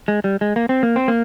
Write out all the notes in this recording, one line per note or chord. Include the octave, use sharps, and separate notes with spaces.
G#3
G3
G#3
A#3
C4
A#3
C4
A#3